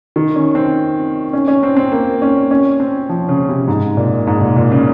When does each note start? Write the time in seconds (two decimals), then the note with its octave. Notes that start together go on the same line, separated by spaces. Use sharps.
0.16 D#3
0.36 C#4
0.55 C4
1.33 C#4
1.48 C#4
1.63 C4
1.77 C4
1.92 A#3
2.22 C#4
2.51 C#4
2.80 C4
3.09 F3
3.29 C#3
3.49 C3
3.68 G#2
3.97 A#2
4.27 G#2
4.41 A#2
4.56 A#2
4.71 C#3